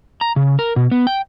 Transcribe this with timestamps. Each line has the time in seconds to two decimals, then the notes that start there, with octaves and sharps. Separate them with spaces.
0.21 A#5
0.36 C#3
0.59 A#4
0.76 B2
0.91 B3
1.07 G5